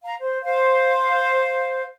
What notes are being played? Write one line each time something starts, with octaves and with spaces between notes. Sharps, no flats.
F5 A#5
C5
C5 F5